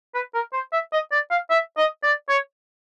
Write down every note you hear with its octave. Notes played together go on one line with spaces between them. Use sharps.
B4
A#4
C5
E5
D#5
D5
F5
E5
D#5
D5
C#5